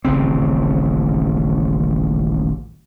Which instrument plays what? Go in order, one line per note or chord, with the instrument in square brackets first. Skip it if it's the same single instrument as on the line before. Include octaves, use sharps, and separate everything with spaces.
[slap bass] D#1 A1 C#3 C4